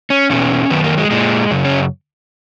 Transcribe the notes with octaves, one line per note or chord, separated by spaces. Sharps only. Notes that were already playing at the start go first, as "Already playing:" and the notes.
C#4
E2 B2 C#4
F#2 D#3 B3
A#3
G#3
A#2 G#3
F#2 C#3
C#4